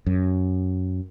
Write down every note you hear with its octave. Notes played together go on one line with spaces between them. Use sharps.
F#2